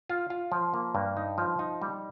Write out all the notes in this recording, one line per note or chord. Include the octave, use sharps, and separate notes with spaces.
F4
F4
F3
A#3
G2
D#4
F3
D#4
G3